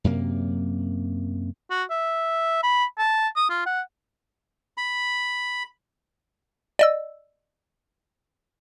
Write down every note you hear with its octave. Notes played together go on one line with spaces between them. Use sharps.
F#2 C3 A#3
F#4
E5
B5
A5
D#6
F4
F#5
B5
D5 D#5 E6